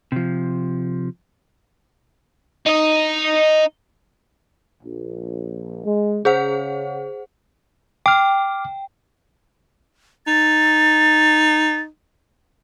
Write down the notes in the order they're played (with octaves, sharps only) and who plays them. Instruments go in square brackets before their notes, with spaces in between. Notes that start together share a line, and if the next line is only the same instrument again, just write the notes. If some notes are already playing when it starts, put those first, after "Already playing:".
[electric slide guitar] C3 F3
[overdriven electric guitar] D#4 D#5
[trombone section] A#1
G#3
[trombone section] C#3 [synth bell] G#4 C5 F#5
[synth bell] G5 [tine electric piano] D6 F6
[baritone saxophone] D#4 [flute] A6